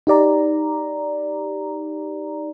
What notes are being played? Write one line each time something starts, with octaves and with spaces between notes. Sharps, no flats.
D#4 G4 D5 A#5